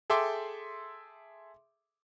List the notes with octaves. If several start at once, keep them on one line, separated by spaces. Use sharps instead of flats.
G#4 A4 E5 G5 C6 D6